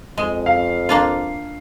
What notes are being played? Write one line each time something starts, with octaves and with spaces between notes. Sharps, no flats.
F2 G#3
F5
A#3 D4 F4